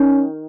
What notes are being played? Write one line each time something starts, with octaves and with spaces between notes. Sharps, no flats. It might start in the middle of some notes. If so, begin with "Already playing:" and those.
Already playing: D#3 C#4